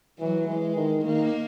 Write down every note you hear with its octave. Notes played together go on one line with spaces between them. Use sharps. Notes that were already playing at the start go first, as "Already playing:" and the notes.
E3 F#3
E3 G#3
D#3
D#3 A#3